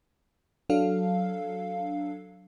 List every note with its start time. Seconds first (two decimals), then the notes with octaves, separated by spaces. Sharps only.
0.69 F#3 D4 A4 F5